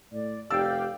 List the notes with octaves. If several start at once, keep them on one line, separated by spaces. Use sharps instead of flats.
A2 D5
F1 G4 D5 F5 G5 E6